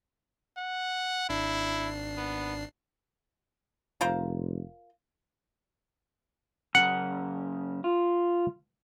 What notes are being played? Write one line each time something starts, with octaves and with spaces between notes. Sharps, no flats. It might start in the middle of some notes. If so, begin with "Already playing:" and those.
F#5
G#1 D4 E4 C7
B3
F1 F4 A#4 C5
F#2 C#3 A#4 F#5
F4